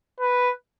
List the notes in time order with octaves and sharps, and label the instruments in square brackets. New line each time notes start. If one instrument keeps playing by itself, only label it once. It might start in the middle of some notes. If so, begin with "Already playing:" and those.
[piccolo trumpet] B4